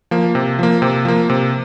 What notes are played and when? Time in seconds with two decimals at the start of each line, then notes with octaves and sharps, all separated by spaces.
0.11 F3 A#3
0.35 C3
0.59 F3 A#3
0.82 C3
1.05 F3 A#3
1.30 C3